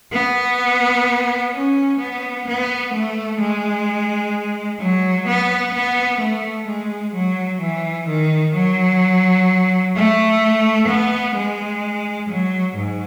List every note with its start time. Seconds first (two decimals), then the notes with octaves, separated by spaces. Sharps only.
0.13 B3
1.53 C#4
1.99 B3
2.47 B3
2.93 A3
3.40 G#3
4.80 F#3
5.28 B3
5.73 B3
6.20 A3
6.67 G#3
7.14 F#3
7.61 E3
8.08 D#3
8.55 F#3
9.96 A3
10.88 B3
11.35 G#3
12.29 F#3
12.76 G#2